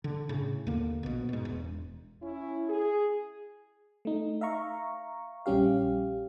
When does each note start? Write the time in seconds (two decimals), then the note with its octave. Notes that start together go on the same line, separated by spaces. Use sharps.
0.04 D3
0.29 A2 C#3
0.67 D#2 D3 A#3
1.03 A#1 B2
1.29 G#2 B2
1.45 E1
2.23 C#4 E4
2.68 G#4
4.05 A3 D#4
4.41 E5 F5 A#5 C#6
5.46 A#1 G3 C#4 G4 F5